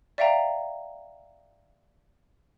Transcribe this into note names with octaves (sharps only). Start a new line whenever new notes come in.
D5 E5 F5 G5 A#5